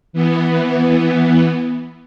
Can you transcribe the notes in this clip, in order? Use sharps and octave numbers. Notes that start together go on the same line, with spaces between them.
E3 B3